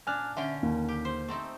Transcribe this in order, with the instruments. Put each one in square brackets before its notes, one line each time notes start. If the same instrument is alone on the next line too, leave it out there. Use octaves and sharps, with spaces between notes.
[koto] A#2 D4 [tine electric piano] G#5 F6 F#6
[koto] D3 C#4 G5 [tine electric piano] E5
[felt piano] D#2 [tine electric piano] A#3
[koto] G4
C5
A3 C4 D#4